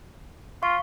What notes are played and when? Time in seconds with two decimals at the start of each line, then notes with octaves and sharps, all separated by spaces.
0.63 F4 F5 C#6